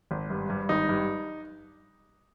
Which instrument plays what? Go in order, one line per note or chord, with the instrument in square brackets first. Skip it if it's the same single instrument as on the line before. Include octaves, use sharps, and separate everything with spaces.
[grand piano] G#1
G2
G2
G#1 D#4
G2